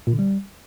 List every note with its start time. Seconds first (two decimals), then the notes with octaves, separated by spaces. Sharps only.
0.07 A#2
0.13 D3
0.19 G3